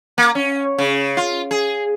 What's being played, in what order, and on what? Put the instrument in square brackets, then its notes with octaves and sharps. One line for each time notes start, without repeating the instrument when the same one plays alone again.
[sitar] A#3
C#4
C#3
F4
G#4